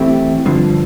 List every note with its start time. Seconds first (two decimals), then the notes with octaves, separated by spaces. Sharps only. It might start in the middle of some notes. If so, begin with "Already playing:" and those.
Already playing: E3 A3 C4 E4 G4
0.46 G2 D3 F3